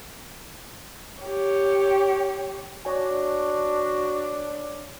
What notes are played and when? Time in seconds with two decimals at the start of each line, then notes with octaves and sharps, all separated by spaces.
1.22 G4 C#5
2.85 D4 F#4 C#5 G#5